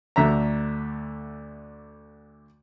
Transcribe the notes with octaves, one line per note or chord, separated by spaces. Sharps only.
D2 D3 E5 A#5